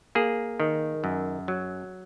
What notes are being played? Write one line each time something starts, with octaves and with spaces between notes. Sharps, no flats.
A#3 G#4
D#3
F#2
F#3